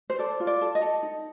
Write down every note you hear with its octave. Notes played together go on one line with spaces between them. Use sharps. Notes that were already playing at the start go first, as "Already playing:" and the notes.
C5
A4 D5
F4
D5
A4
D#5
A4
D#4